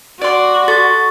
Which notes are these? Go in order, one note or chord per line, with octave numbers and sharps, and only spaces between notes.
F#4 D5 C6
A4 C#6 A6